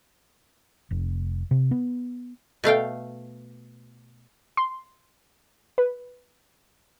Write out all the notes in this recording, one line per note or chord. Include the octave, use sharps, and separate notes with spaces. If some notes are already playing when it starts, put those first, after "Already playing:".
F1
C3
B3
B2 A3 F5 G5
C6
B4